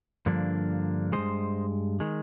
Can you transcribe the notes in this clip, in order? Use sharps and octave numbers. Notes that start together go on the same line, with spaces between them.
G2 D3 F3 A#3 D4
D#3 G#3 C5 D#5
G2
D#3 G#3